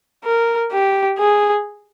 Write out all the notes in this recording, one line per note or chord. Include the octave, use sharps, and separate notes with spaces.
A#4
G4
G#4